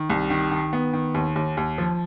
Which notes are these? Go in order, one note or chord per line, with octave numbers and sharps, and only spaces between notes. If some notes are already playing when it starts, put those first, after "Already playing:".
Already playing: D#3
C2
D#3
D#3
B3
D#3
D#2
D#2
D#2
F3